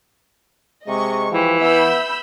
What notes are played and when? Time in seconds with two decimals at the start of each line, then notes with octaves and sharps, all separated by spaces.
0.88 C3 G#3 D#5 C#6
1.32 E3 F3 G4
1.61 B3 E5 B5 E6 G6